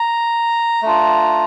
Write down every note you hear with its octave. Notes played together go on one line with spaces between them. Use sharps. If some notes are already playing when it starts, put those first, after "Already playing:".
Already playing: A#5
A3 D4 F4